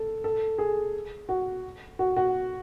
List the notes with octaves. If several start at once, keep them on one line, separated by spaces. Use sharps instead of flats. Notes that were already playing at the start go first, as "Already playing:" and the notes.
Already playing: A4
A4
G#4
F#4
F#4
F#4